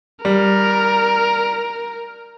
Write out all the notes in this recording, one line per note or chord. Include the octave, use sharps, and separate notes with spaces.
G3 A#4